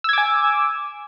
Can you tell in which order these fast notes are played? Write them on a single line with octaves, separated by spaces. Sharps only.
E6 G#6 D6 G#5